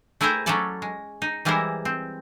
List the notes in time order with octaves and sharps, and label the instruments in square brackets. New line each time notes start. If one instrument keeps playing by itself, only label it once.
[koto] A3 E4 G#4 A#4 C5 G5
F#3 A3 C#4 A4 D5 A5
G#3
D#4
E3 G3 G#3 E4 A#4 C5
C4